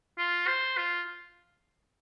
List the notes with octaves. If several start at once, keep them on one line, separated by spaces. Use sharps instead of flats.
F4
C5
F4